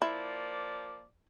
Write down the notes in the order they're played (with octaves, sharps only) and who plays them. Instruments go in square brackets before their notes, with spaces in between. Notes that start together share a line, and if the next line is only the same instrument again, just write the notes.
[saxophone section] F3 A#3 D5 [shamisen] E4